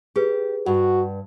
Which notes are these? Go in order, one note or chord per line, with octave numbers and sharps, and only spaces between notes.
G4 G#4 B4
G2 F#4 F#5